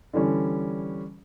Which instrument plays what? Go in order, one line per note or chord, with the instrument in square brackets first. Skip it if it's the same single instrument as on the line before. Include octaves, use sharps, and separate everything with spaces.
[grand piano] D3 E3 G3 C#4